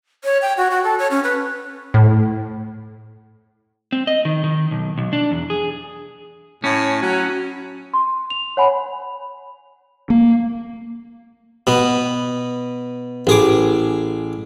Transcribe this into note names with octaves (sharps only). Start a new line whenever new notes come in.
C#5
G5
F#4
F#4
A4
C#5
C#4
B4
A2
C4
D#5
D#3
D#3
B1
B1
D4
E2
G#4
A2 C#4
F#3
C6
F7
C#5 F#5 G#5 B5
A#3
B2 B3
A1 G#4 D6